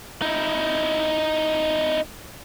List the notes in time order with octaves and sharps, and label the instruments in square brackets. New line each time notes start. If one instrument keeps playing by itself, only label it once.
[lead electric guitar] D#4 E4